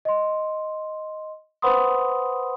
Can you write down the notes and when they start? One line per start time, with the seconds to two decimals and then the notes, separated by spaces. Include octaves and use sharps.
0.05 D#5 C6
1.62 B4 C5 F#5 B5 C6 D#6